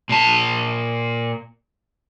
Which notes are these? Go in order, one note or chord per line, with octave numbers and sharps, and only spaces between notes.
A#2 A5